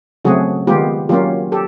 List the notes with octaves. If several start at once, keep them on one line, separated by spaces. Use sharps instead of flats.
C#3 F#3 A3 C4 F#4 G#4
D#3 G#3 B3 F4 G4
F#3 A#3 C#4 F4 G4
G4 A4